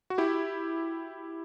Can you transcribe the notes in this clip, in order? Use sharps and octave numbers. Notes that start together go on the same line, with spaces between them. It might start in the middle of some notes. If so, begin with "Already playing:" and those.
F#4
E4 G4